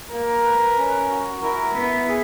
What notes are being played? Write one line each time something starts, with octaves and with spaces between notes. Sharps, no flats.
A#3 A#4
B4
C#4
F#4
E4 A#4
B3 E5
G#4